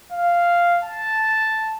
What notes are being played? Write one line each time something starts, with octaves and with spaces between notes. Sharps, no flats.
F5
A5